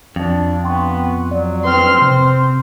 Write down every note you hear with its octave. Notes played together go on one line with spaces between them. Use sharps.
F2 D4
B3 G5 C6 C#6
F#3 D5
C4 B4 C6 F6
C3 C4 C5